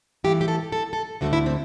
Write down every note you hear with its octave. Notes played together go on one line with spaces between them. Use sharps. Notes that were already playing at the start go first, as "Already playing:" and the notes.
G2 E3 A3 G4
G4
A4
A4
A4
D2 D3 A3 F#4
E4
C4